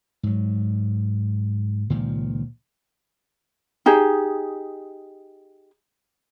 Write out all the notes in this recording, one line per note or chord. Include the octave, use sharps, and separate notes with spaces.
G#2 F#3
C#2 A#2 D#3 F3
D#4 G4 G#4